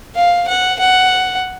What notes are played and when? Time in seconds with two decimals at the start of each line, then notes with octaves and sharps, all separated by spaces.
0.16 F5
0.48 F#5
0.80 F#5